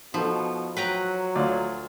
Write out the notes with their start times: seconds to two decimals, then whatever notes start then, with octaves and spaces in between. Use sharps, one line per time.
0.14 B2 F3 D#4 A4
0.77 F#3 B4 G5 A#5
1.35 D2 F4 D5